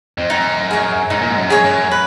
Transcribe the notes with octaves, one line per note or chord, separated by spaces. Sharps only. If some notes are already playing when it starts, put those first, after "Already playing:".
F2
F#2 D#4
G#4 C#5
G#2 D#4
A#2
G#2
F#2
G#4 C#5
F#2
B4